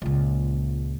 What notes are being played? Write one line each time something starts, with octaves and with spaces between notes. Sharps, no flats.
C#2 A#2